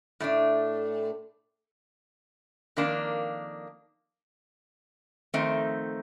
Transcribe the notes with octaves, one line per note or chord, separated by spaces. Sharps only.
A2 A3 D4
F2 D#3 A#3 D4
F2 D#3 A3 C4 D#4